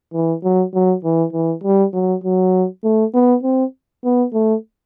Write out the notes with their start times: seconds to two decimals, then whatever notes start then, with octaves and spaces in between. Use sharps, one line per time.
0.13 E3
0.43 F#3
0.74 F#3
1.04 E3
1.33 E3
1.64 G3
1.94 F#3
2.24 F#3
2.84 A3
3.14 B3
3.43 C4
4.04 B3
4.34 A3